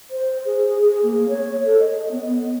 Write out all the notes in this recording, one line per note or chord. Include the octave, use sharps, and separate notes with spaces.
C5
G#4
G#4
G#4
A#3
C#5
A4
D#5
B3